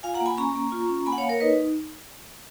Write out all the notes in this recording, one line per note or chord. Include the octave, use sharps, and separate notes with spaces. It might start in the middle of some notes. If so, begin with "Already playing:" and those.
F4 F5 G#5
F#5 A#5
A#3
G#5 B5
C#4 A#5 C#6
A#3
F4
C#4
A#3 G#5 B5
F#5
C#5 F5
A#3
A#4 C#5
D#4 B4 D#5